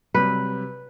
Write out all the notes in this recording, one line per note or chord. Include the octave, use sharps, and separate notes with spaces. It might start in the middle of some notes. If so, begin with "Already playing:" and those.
C3 F#3 G3 B4